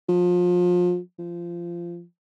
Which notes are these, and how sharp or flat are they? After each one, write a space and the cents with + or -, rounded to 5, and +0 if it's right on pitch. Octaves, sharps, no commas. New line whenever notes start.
F3 +30
F3 -20